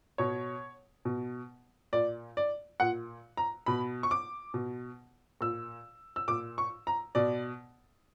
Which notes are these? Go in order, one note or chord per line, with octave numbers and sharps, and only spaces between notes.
B2 C#5
B2
A#2 D5
D5
A#2 F#5
A#5
B2 B5
C#6
D6
B2
A#2 E6
E6
A#2 D6
C#6
A#5
B2 D5